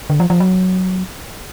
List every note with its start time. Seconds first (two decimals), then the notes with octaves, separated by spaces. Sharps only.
0.10 D3
0.20 F3
0.30 F3
0.40 F#3